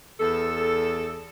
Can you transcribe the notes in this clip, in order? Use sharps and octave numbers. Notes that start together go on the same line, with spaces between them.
E2 A4